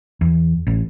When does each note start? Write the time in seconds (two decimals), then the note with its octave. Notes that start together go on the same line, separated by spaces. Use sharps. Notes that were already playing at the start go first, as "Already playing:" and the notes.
0.21 E2
0.67 A1